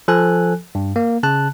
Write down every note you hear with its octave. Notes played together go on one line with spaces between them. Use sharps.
F3 A4 G#5 F#6
G2
A#3
C#3 A5 F#6